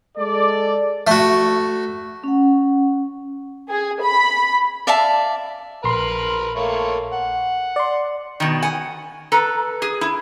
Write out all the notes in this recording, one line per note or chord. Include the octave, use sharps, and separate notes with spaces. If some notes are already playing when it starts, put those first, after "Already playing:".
G#3 A4 D5
A3 F#4
C#4 F#5
G#4
B5
D5 E5 F5 A5
A#1 A#4 B4 B5 C6
A3 A#3 C#5
F#5
D5 C6
B2 D#3
F#5 G#5
A4 B4 A#5
G#4
E4